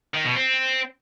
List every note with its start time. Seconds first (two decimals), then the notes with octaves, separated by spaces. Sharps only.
0.15 D#3
0.25 B2
0.36 C4